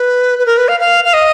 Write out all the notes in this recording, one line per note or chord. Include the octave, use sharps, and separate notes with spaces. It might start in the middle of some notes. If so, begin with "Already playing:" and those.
Already playing: B4
B4
A#4
B4
F5
F5
F5
D#5